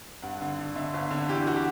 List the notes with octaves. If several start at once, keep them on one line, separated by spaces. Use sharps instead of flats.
G2 F#5
D3
D3
D3 E5
G1
D3
E3 G4
F#4
G4